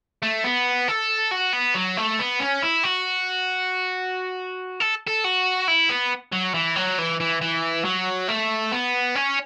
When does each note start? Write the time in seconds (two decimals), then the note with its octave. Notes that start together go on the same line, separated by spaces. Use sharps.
0.23 A3
0.44 B3
0.88 A4
1.31 F#4
1.53 B3
1.75 F#3
1.97 A3
2.19 B3
2.40 C#4
2.63 E4
2.84 F#4
4.80 A4
5.07 A4
5.24 F#4
5.68 E4
5.89 B3
6.32 F#3
6.54 E3
6.76 F#3
6.99 E3
7.20 E3
7.41 E3
7.85 F#3
8.29 A3
8.72 B3
9.15 C#4